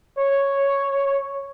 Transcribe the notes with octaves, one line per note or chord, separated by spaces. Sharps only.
C#5